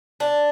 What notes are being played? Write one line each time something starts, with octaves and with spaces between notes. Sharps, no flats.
D4